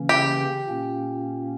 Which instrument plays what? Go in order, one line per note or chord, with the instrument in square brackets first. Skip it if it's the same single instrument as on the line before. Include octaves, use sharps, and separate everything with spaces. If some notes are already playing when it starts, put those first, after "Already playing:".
Already playing: [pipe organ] C#3 E3 A#3 C#4
[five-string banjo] G4
[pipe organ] A#2 A#3 C#4